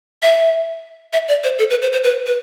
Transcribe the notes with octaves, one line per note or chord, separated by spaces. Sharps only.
E5
E5
D5
C5
A4
B4
C5
C5
B4
B4